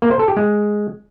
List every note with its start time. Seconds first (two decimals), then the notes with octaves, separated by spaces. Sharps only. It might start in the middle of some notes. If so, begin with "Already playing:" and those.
0.02 A#3
0.11 C5
0.19 A4
0.28 G4
0.37 G#3